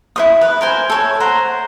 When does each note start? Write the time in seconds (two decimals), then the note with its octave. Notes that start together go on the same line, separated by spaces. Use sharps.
0.16 E4 C5 D#6
0.41 B4
0.61 A#4 C5 G#5
0.90 A4 C#5
1.20 C5 F#5 A#5